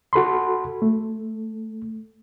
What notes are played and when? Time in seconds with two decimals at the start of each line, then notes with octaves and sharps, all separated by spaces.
0.13 F#4 A4 B5 C6
0.82 A3